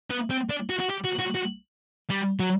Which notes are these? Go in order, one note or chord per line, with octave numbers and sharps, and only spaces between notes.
B3
C4
D4
F#4
F#4
G4
F#4
F#4
F#4
G3
F#3